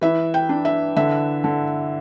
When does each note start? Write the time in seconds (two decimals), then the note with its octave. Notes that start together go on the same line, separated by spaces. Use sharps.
0.01 E3 E5
0.34 G5
0.49 D4
0.65 E5
0.96 D3 E5
1.44 D3